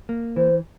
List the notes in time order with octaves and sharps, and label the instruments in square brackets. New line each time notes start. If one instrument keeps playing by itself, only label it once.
[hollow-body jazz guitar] A#3
[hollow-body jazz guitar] E3 [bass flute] C5